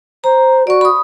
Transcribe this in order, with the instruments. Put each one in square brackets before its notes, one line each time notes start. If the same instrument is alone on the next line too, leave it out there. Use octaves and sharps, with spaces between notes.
[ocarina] C5 [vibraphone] A#5
[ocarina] F#4 [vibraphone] D5 C#6
[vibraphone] B5 D#6